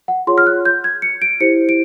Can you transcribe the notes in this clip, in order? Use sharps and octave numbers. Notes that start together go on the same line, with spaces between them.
F#5
F4 G#4 C#5 C6
F6
F#6
G6
G#6
C#7
D7
E4 G4 C5 C#7
D7